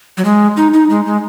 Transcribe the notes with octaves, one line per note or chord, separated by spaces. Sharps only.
F#3
G#3
D#4
D#4
G#3
G#3